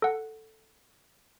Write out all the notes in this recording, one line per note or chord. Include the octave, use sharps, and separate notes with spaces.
A4 F#5